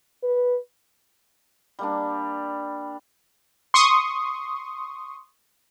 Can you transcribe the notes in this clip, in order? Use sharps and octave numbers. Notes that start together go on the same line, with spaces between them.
B4
G3 A#3 D4
C6 C#6 D#6